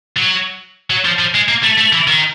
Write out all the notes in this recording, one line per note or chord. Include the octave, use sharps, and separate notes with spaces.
F#3
F#3
F3
F3
G#3
A#3
A3
A3
E3
D#3